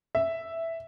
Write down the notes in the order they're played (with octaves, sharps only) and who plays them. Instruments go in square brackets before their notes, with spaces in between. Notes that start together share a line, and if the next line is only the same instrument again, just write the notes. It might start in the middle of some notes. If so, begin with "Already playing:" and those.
[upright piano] E5